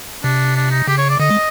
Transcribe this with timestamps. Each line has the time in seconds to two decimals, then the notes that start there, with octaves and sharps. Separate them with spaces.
0.23 C3 D4
0.56 D4
0.71 D#4
0.88 C#3 G4
0.98 C#5
1.09 D5
1.20 D3 D#5
1.31 G#3